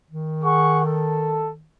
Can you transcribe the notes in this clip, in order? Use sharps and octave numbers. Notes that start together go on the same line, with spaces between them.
D#3
G#4 F#5 C#6
A4